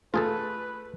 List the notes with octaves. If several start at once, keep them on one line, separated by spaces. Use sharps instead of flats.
A3 F4 G#4 A4 B4